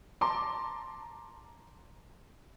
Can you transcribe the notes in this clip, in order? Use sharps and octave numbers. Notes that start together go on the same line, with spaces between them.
A5 A#5 C6 D6